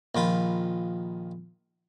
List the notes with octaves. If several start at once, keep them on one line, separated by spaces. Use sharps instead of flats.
A#1 D#3 F4 B5